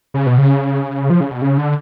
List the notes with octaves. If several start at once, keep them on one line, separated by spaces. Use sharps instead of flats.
C#3
B2
C#3
F3
C#3
B2
C#3
D3